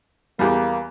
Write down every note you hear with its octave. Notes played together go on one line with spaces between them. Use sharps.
E2 G3 A#3